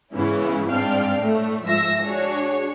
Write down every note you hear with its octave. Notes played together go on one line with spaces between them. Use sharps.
G#2 C#3 E3 B3 C#4 E4
G#2 C4 D4 F5 G5 F6
A2 A3
G#2 F3 E5 E6 A#6
D4 F#4 G#4 C#5